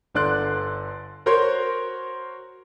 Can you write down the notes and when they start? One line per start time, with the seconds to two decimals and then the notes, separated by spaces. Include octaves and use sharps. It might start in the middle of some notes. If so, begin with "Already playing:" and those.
0.15 G1 D3 D5 C6 F#6
1.26 F#4 A#4 C5 C#5 C6